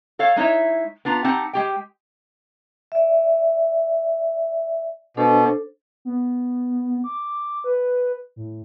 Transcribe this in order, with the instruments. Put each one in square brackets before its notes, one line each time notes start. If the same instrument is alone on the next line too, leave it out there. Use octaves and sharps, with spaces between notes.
[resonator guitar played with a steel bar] A4 C#5 F5
G#3 D#4 E4 C#5 E5
B3 D4 F4 A#5
C4 D#4 G4 F#5 A5
G#3 G4 G5
[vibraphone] D5 E5
[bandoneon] B2 [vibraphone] D4 A4 C5
[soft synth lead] B3
D6
B4
A2